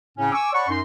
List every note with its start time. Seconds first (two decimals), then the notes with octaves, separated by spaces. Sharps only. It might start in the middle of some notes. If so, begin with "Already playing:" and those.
0.18 A2 C#3 C#4
0.33 G#5 C#6 D6 E6
0.53 C#5 D5 F#5 A5 B5 C#6
0.68 F#2 D#4 C6